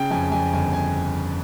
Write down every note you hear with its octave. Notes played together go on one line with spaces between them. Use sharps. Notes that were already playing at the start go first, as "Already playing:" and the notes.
Already playing: C#3 G5
F2 G#5
F2 G#5
G1 G#5
G#5